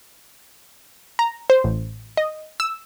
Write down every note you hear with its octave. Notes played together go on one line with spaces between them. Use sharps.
A#5
C5
A1
D#5
E6